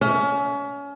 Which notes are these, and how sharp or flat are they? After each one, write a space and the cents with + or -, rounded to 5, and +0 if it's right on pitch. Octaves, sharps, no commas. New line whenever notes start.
C#4 +30 E5 +0